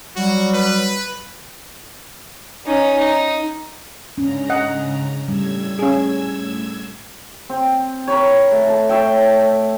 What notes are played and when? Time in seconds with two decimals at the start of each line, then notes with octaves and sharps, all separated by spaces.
0.16 F#3 G3 F#4
0.53 B4
2.66 C#4 D#4
2.98 D#4
4.18 G#2 C#3 C#4 D4 A#5
4.50 D#5 F#5
5.28 A2 G3 E6 G#6
5.79 C#4 G#4
7.49 C4
8.08 A#4 B4 C#5
8.51 A3
8.67 A5
8.89 C#5 E5 G5